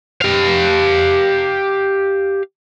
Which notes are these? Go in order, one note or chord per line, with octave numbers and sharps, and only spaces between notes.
G4 F5